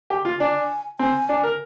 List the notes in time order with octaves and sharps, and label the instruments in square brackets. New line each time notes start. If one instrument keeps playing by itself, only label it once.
[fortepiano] G4
F4
[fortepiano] D4 [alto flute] G#5
[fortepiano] C4 [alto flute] G#5
[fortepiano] D4
A#4